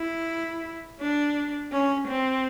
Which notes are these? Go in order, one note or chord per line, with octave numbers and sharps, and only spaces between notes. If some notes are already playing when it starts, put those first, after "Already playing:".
Already playing: E4
D4
C#4
C4